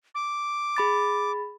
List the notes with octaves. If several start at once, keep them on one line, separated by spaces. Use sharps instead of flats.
D6
G#4 B5 A6